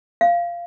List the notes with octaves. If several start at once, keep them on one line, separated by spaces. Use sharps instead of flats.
F5